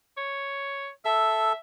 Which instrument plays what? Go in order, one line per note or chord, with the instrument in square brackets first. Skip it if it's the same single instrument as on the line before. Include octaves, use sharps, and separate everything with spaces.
[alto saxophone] C#5
[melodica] A4 [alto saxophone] E5